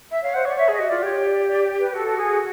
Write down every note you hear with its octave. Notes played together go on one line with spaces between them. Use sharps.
E5
C#5 F5
C5 F#5
C#5 D5
C#5 E5
G#4 D#5
F#4
F4 D5
G4 C#5
D5
D5
B4
F#4 A4
G#4